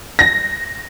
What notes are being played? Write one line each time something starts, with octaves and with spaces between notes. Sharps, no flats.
A#6